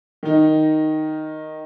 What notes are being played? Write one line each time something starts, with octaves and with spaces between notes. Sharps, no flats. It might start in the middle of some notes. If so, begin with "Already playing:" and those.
D#3 D#4